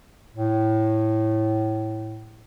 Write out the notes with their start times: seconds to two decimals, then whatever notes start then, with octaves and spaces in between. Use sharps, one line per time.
0.34 A2